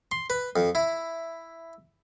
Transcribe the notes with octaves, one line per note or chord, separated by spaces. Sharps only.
C6
B4
F2
E4